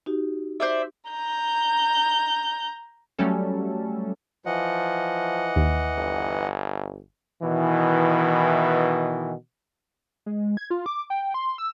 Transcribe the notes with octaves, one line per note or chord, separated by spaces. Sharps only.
D#4 F#4 G4
C5 D5 E5
A#5 G6
F#3 G3 A3 C#4 A4
E3 F3 D#5 F#5
D#2
G1
B2 D#3 E3
G#3
G#6
F4
D6
G5
C6
E6